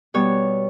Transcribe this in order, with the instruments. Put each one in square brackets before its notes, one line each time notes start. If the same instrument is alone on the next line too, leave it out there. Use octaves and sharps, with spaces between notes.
[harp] B2 G3 B3 C#5